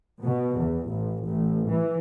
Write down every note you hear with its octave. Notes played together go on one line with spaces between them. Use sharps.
B2
E2
A1
A1
E3